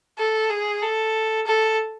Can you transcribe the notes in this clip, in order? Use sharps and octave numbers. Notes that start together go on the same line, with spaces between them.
A4
G#4
A4
A4